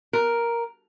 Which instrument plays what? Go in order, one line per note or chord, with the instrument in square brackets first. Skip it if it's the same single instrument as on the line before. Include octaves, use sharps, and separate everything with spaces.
[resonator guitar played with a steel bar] A#4